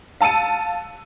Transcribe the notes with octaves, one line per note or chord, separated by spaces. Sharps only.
F5 A5 E6 C#7 D#7